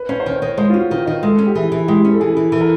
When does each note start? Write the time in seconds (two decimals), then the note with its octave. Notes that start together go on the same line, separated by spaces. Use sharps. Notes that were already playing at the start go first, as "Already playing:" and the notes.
Already playing: B4
0.09 C#4 C5
0.20 C5
0.25 D#3 C#5
0.36 C5
0.42 D#3 C#5
0.57 G#3 C5
0.70 F4
0.74 C#4 F#4
0.90 D#3 F4
1.06 D#3 D#4
1.23 G#3 A4
1.39 C#4
1.47 G4
1.55 E3 G#4
1.72 E3
1.88 G#3 G4
2.05 C#4
2.12 A4
2.20 E3 G#4
2.37 E3
2.52 E3 A4
2.61 A#4